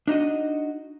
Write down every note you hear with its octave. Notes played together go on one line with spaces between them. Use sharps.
D4 D#4 F#4 D#5